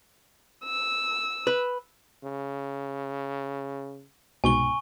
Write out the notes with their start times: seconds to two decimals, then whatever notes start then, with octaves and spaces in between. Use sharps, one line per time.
0.65 E6
1.47 B4
2.24 C#3
4.44 C2 G#2 B2 G#5 C#6 G7